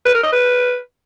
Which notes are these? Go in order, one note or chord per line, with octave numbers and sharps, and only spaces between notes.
B4
A#4
D#5
B4